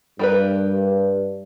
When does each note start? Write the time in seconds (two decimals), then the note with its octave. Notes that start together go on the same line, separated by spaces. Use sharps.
0.19 G2 G3 A#4 B4